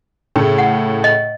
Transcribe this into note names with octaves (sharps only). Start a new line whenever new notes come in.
A2 C#3 A3
F#5
D#5